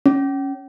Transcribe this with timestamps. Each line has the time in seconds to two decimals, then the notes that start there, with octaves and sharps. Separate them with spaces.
0.06 C#4